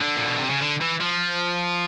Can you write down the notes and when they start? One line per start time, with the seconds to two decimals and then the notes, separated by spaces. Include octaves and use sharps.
0.01 D3
0.16 A#2
0.27 B2
0.38 C3
0.50 C#3
0.61 D3
0.81 E3
1.00 F3